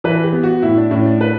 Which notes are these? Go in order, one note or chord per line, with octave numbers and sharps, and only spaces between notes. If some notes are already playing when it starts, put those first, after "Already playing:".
E3 B4
G4
B3
F#4
A2 E4
D4
A2 C#4
D4
B4